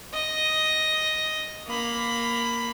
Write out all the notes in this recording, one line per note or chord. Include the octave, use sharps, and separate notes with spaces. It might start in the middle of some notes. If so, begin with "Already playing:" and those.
D#5
A#3 B5